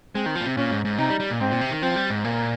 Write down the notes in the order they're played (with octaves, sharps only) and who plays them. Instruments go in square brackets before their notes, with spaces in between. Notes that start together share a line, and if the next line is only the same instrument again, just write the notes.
[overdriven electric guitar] G#3 [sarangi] C4
[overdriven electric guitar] D#3
F3
A#2
C3
[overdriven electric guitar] A#2 [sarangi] C#4
[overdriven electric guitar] G#2
G#2
[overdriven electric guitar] C3 [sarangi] D#4
[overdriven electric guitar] G3
G3
A#2
[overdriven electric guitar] G#2 [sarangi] C4
[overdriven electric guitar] A#2
C3
D#3
[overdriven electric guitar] F3 [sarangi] C4
[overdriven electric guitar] G3
G#2
[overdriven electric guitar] A#2 [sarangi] A#3